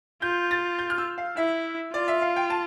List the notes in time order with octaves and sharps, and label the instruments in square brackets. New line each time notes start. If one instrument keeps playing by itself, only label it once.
[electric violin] F4 [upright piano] G6
[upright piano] A6
G6
F6
E6
F5
[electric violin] E4 [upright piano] E5
[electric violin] F4 [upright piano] D5
[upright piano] E5
F5
G5
A5